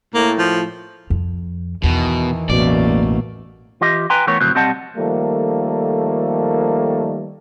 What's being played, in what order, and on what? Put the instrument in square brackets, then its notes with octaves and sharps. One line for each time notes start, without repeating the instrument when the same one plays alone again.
[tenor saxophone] A2 [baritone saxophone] A#3
[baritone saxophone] F3
[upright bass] F2
[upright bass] E2 [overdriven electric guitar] B2 [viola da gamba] D#3 E3
[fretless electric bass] A1 B2 [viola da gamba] F#2 A3 A#3 [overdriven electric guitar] D5
[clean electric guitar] E3 F4 G4 D#5
B4 G5 G#5 A#5 C6
E3 A3 B3 A#4 C#5
F2 A2 C#3 F#3 C4
B1 G3 C4 D#5 F#5 A5
[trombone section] D#3 F3 G3 A3 A#3 A4